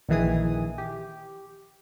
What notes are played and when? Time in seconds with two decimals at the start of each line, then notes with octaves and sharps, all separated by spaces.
0.08 A#1 D#3 E3 G#4 D#6
0.78 G4